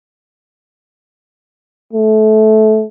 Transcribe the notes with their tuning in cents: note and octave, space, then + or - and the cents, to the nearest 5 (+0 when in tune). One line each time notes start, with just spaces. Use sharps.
A3 -20